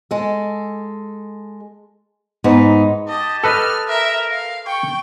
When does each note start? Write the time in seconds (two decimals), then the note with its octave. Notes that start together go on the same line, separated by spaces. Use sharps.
0.11 G#3 A4
2.44 G#2 B3 D#4
3.08 G4 D#5 A5
3.44 A4 B4 D#5 F6
3.88 A#4 E5
4.31 F5
4.67 G5 C#6